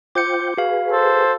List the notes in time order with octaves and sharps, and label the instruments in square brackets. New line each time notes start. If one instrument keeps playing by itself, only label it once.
[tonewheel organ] F4 C5 G5 [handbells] D6 G6 C#7
[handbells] F#4 F5 [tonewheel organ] G#4 B4
[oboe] A4 [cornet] C5